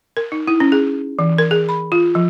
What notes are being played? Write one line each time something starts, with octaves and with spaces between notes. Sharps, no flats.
A#4
D#4
E4
C#4
G#4
E3
A#4
G#4
B5
F4
F3